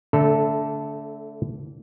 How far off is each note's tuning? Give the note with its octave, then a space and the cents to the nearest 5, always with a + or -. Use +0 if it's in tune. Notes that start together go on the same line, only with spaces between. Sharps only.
D3 -30 A3 +0 A4 +0